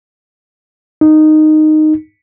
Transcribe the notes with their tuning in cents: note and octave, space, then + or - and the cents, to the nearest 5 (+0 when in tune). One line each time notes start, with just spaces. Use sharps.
D#4 -10